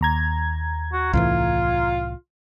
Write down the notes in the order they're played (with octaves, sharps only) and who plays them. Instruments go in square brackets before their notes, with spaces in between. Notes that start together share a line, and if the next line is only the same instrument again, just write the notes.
[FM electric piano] D#2 A#5 G#6
[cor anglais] F#4
[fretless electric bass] C2 A2 E3 [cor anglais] F4